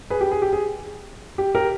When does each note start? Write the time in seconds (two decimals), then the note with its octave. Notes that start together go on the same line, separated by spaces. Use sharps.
0.10 G#4 B4
0.21 G4
0.31 G#4
0.42 G4
0.53 G#4
1.38 G4
1.55 G4 A#4